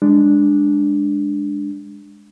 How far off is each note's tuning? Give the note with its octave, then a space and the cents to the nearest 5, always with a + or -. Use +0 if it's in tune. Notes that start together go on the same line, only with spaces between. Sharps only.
G#3 -15 D4 +0